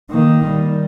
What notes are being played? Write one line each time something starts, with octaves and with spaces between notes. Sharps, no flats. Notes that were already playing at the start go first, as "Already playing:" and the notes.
D#3 A#3
G3